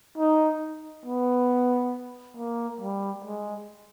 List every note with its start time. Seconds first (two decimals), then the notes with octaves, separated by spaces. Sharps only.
0.18 D#4
1.06 B3
2.37 A#3
2.81 G3
3.25 G#3